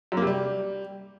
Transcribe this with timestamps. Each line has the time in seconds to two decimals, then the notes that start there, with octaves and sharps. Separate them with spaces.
0.12 F#2
0.17 A#3
0.22 C3
0.27 G3